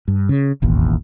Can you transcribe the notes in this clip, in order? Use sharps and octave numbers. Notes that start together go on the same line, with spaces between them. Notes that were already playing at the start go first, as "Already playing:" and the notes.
G2
C#3
E1 A1 D#2